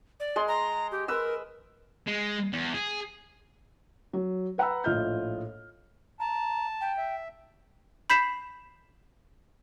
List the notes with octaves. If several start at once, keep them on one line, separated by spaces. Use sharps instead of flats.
D5
G#3 C6
A#5
G4
A#4 B4 E6
G#3
E2
G#4
F#3
B4 F#5 A#5 B5 E6
A#1 A2 F4 D#5 F6 G6
A5 A#5
G5
E5
B5 G6 B6 C7 E7